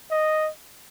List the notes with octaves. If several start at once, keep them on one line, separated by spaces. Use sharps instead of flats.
D#5